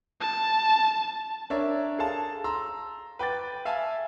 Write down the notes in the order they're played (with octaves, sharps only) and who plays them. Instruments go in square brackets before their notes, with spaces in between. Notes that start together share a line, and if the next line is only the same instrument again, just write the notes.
[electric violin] A5
[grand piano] D4 A#4 C#5 E5
G#4 A4 F5 A5
A#5 C6 E6
B4 G5 D6 A6
E5 F5 G#5 A5